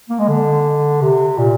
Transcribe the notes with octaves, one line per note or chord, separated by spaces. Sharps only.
A#3
G#3
D3
C3
A#2